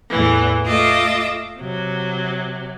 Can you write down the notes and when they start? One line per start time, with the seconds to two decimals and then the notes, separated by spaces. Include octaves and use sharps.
0.11 E2 A2 E3
0.64 A3 F4 D#5 E5 D6
1.58 C3 F#3